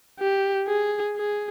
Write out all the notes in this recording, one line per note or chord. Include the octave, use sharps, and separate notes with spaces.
G4
G#4
G#4